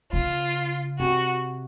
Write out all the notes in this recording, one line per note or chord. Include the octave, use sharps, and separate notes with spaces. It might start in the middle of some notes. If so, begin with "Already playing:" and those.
C#3 F4
C3 F#4